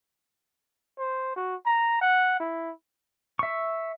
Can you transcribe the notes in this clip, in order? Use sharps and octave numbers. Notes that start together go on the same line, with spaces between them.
C5
F#4
A#5
F#5
E4
E5 C#6